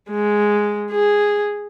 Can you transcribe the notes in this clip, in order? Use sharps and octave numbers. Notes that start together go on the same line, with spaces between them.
G#3
G#4